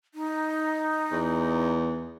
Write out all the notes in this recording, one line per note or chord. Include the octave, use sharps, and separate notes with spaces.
D#4
E2